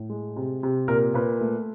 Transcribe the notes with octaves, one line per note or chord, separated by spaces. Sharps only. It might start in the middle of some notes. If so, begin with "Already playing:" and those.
Already playing: A2
G#3
C3
C3
A#2 A#4
A#2 B4
A3